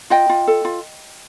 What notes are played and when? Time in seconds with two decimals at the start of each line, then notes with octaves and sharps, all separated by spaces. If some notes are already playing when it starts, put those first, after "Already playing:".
0.10 F4 D#5 G5
0.29 F4
0.47 A4
0.65 F4